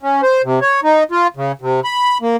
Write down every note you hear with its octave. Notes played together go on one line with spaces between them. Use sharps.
C#4
C5
C3
C#5
D#4
F4
C#3
C3
B5
A#3